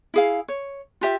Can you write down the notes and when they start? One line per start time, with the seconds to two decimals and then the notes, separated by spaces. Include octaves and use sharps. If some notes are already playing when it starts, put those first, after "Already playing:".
0.14 E4 G#4 F5
0.48 C#5
1.01 F4 G4 E5